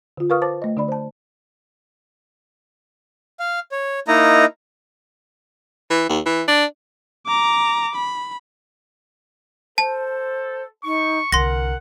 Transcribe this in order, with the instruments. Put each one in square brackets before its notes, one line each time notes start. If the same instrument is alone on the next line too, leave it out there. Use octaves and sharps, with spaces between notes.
[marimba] D3 F4
A#4 B4 F5 C#6 D#6 F6
C5 A5 D6 A6
A3 D#5
D3 D4 D5 B5
C5 A5
[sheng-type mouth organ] F5
C#5
A#3 D#4 E4 D#5 A#5
[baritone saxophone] E3
D#2
E3
D4
[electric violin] A#5 D6
B5
[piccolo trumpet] A4 [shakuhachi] C5 [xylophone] A5
[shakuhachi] D#4 [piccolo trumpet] C#6
[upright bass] C2 D3 [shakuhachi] A#4 [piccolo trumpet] F#5 [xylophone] C6 A#6